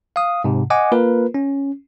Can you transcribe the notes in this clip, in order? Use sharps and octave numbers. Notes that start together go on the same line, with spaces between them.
F5 D#6
G#2 C3
D#5 F#5 G#5 D6
A#3 F4 A#4 B4
C#4